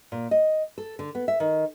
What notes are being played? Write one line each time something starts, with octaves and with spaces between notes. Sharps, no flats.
A#2
D#5
A4
D3
B3
E5
D#3